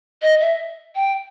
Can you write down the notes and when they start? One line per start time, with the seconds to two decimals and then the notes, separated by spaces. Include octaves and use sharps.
0.22 D#5
0.40 E5
0.95 G5